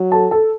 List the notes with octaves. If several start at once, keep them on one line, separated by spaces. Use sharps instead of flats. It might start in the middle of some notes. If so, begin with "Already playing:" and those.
Already playing: F#3
A4 A5
A4 A5